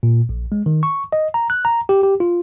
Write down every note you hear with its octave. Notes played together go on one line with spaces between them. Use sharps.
A#2
A#1
G#3
D#3
C#6
D#5
A#5
F#6
A#5
G4
G4
F4